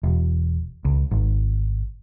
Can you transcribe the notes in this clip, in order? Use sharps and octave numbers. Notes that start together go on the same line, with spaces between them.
E1
C#2
G#1